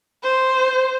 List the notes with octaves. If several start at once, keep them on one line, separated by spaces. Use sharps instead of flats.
C5